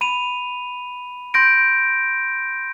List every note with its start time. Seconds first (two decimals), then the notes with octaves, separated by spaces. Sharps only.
0.01 B5 D#7 F7
1.34 C6 G6 A#6 D7